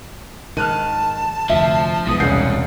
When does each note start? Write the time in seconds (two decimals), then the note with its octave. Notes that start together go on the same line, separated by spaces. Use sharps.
0.57 G#2 D#3 A5 F6 F#6 D#7
1.50 F1 D2 F3 E5
2.07 B1 E2 G#2 E3 D#6
2.20 E1 C2 C#3 F#5 G6 C7